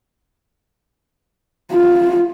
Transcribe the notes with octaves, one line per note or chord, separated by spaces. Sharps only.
F4